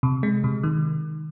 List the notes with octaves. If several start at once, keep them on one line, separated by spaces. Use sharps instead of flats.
C3
G#3
C3
D#3